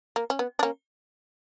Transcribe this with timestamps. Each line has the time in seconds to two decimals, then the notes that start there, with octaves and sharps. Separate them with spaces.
0.16 A#3
0.30 C#4
0.39 B3
0.59 D4
0.63 A#3 C#4